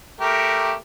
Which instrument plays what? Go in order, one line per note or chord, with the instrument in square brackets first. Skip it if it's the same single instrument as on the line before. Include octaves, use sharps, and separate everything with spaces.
[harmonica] A3 G4 A#4